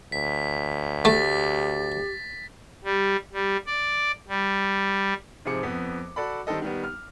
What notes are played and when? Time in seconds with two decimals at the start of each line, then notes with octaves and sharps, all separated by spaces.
0.12 D2 B6
1.05 A3 G4 A6 B6
2.84 G3
3.33 G3
3.66 D5
4.28 G3
5.45 G#2 C3 F3 G#4 D6 C#7
5.63 F2 B3
6.16 F#4 A4 D5 B5
6.47 D#3 G3 C4 A4 D#5
6.62 D#3 G3 B3
6.84 F6